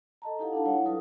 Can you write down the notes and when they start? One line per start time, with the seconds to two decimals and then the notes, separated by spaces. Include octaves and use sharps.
0.22 A4 D#5 A5 A#5
0.39 D#4 E4 G4 A4 F5 F#5
0.53 D4 F5 A5
0.65 G3 E4 F4 C#5 F#5
0.86 F#3 F4 A4 B4 D#6